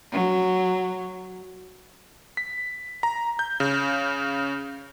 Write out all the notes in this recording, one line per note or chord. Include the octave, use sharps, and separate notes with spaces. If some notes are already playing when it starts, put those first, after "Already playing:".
F#3
B6
A#5
G6
C#3